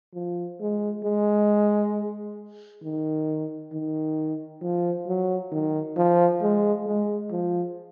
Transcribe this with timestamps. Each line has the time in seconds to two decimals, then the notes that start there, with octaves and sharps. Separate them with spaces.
0.14 F3
0.60 G#3
1.04 G#3
2.83 D#3
3.72 D#3
4.62 F3
5.07 F#3
5.51 D#3
5.97 F3
6.42 G#3
6.86 G#3
7.31 F3